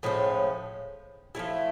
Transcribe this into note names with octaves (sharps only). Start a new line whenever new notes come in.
A2 F3 G#3 C#4
F3 A3 C#4 E4